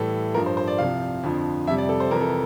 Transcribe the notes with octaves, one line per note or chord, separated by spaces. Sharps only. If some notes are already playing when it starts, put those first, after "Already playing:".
Already playing: A2 E3 G3 A4
G2 F3 A#4
C5
C5
D5
C2 C3 F3 F5
F2 D3 F3
F2 C3 G3 E5
D5
A4
C5
F2 C3 E3 A#4
A4